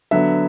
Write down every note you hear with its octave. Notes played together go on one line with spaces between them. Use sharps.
D3 F#3 B3 E5